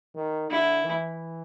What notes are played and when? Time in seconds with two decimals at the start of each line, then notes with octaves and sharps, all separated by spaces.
0.15 D#3
0.50 D3 E4
0.84 E3